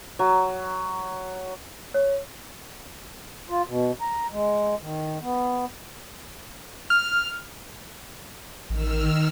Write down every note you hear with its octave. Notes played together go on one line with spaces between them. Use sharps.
F#3
C#5
F4
B2
A#5
G#3
D#3
B3
F6
A1 D#3 E6 F6